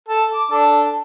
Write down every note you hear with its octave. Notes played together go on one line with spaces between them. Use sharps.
A4
D6
D4 A4